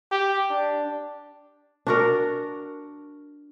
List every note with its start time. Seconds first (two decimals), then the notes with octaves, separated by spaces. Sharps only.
0.11 G4
0.50 D4
1.87 D4 F#4 A#4